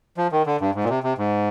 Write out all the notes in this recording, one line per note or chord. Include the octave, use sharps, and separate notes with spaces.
F3
D#3
D3
G2
G#2
A#2
C3
C3
G#2